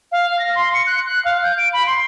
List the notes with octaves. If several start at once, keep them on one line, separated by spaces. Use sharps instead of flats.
F5
A#6
C6
C#7
F#6
F#6
F5
G6
D7
B5
C6